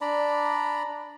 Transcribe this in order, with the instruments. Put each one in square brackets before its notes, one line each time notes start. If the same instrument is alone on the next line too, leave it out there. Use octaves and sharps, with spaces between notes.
[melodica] D4 D5 A#5 B5